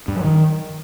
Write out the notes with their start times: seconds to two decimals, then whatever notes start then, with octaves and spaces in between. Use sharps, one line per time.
0.08 G2
0.16 F#3
0.24 D#3